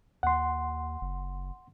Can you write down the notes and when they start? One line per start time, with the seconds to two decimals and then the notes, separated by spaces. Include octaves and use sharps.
0.23 D#2 F#5 C6
1.01 F#1